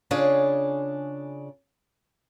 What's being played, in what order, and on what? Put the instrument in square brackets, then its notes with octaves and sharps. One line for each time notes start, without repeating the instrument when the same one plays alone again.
[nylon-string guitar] C#3 D4 F4 G#4 C#5